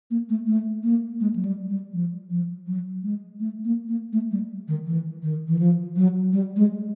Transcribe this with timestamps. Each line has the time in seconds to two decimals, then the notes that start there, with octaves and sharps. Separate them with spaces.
0.11 A#3
0.29 A3
0.47 A3
0.83 A#3
1.20 G#3
1.36 F#3
1.45 G3
1.70 G3
1.93 F3
2.30 F3
2.67 F#3
3.03 G#3
3.40 A3
3.65 A#3
3.88 A#3
4.13 A3
4.31 G3
4.68 D#3
4.86 E3
5.22 D#3
5.48 E3
5.59 F3
5.96 F#3
6.33 G3
6.57 G#3